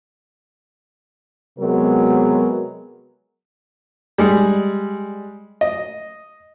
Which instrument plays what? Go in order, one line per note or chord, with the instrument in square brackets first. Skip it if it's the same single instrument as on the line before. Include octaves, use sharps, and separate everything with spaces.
[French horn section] C3 F#3 G#3 B3 A#4
[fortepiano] G3 G#3
D#5